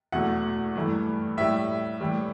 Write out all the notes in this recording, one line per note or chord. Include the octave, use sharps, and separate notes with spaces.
E2 B2 A3 F#5
G2 E3 A3
A2 G3 E5
A2 E3 G3